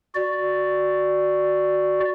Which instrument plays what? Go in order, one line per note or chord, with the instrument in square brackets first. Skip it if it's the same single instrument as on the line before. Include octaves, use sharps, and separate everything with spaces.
[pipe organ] F#4 D5